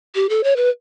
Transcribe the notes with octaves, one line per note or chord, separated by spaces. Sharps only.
G4
A4
C#5
B4